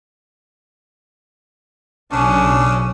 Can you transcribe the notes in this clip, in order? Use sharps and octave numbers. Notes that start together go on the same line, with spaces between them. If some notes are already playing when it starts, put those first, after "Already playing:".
B1 C#3 C#4 D4